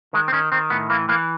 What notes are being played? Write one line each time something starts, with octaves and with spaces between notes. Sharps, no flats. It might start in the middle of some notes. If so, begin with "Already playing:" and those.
D#3 G#3
C4
D#3 C#4
D#3 C4
A2 B3
E3 A#3
E3 A#3